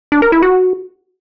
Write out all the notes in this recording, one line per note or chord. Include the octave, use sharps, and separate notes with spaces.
D4
A#4
E4
F#4